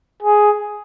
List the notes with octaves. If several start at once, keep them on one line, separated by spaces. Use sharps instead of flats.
G#4